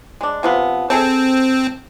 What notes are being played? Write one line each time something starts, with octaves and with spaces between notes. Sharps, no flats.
G#3 D4
C3 F3 B3
C4 G#4 A4 A5